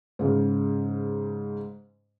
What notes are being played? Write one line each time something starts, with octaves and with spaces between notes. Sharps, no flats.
G#2 C#3